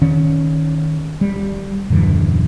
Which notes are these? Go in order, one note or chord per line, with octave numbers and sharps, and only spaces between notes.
D#3 C#4
G3
D#1 F#2 D3 E3